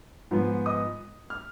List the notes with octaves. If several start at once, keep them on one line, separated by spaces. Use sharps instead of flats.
G#2 F3 B3
D#5 D#6
F6